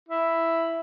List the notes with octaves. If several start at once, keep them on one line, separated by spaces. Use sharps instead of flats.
E4